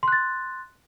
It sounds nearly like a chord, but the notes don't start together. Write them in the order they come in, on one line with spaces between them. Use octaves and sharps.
C6 F#6 A6